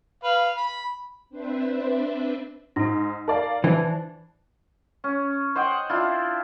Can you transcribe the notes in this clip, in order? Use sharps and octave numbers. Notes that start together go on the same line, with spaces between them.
B4 F5
B5
C4 D4 B4 C5 E5
G#2 D#4 C5 A#6
A#4 D5 F5 A5
E3 D4 C5
C#4
C5 D#5 F#5 G5
D4 E4 F4